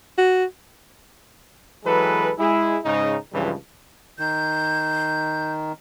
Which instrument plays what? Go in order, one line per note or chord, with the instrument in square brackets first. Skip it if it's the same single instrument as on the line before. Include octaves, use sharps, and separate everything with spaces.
[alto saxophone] F#4
[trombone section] E3 F#3 G#3 A4 B4
G#3 E4 G#4
G#2 C#3 D#4
C#2 G2 C#3 E3 F3 G3
[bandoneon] D#3 [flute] G6